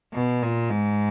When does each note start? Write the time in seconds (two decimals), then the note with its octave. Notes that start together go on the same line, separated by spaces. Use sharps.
0.14 B2
0.42 A#2
0.70 G#2